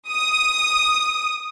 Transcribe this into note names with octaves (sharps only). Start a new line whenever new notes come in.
D#6